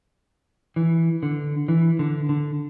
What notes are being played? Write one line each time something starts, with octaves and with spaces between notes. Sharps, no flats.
E3
D3
E3
D3
D3